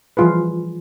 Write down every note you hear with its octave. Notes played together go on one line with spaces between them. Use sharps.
E3 F3 G3 F4 G#4 B4